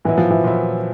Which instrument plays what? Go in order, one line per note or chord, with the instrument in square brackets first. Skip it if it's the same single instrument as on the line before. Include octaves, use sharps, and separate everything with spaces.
[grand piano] A#2 F#3 B3 E4 [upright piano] E3
[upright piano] F3
E3
[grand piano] A#2 F#3 B3 E4